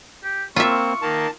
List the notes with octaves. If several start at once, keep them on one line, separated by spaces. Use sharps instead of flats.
G4
A#3 C4 F4 E5 C#6
D#3 A#3 A5